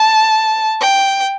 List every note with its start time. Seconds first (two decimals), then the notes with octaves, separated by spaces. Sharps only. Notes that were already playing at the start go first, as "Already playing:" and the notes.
Already playing: A5
0.80 G5